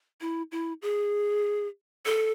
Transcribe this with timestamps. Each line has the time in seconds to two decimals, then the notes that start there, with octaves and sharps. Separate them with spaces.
0.21 E4
0.52 E4
0.82 G#4
2.05 A4